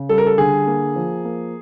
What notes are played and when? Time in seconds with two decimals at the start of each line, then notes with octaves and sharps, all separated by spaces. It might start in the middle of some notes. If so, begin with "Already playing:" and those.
Already playing: C#3
0.09 G3 A4
0.18 A#4
0.27 A4
0.38 D3 G#4
0.67 A#3
0.96 F3
1.25 A#3